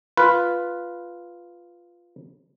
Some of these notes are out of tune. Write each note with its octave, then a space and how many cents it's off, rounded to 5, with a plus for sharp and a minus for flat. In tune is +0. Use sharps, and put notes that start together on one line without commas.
F4 +0 B4 +0